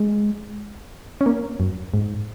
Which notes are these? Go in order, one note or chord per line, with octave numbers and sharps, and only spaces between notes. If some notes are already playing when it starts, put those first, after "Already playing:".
Already playing: G#3
C#4
A#3
F#2
G#2